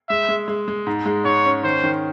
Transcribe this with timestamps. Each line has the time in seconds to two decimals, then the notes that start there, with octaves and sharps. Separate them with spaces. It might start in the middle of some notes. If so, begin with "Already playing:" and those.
0.09 G#3 E5
0.29 G#3
0.48 G#3
0.68 G#3
0.87 G#2
1.06 G#3
1.25 G#2 C#5
1.45 C#4
1.64 D#3 C5
1.84 D#3